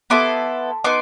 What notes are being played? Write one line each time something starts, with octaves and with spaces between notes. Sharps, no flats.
B3 E4 A4 C6 D6
B3 D#4 C6 D6